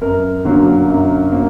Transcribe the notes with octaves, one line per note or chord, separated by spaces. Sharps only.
F#2 A#4
D3 F#3 A#3
F#2
F#3 A#3